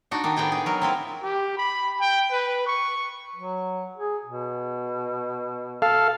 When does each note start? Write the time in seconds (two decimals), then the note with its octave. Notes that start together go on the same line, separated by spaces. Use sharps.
0.11 D4 D#4 F#4
0.24 D#3 D4 D#4
0.36 A2 B3 G#4 G5 G#5
0.52 G#4
0.66 F#3 A#4
0.82 C4 E4 F4
1.23 G4
1.57 B5
2.00 G5
2.32 B4
2.67 C#6
3.36 F#3
3.97 G#4
4.25 B2
5.82 A4 F5